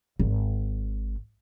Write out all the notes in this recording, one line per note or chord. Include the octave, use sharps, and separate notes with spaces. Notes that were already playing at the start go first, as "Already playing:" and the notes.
G#1